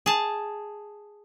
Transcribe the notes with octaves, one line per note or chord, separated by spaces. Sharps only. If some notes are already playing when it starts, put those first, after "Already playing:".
G#4 A5